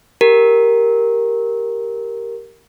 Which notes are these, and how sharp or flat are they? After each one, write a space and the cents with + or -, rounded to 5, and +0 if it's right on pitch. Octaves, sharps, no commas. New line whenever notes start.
G4 +0 A#4 +0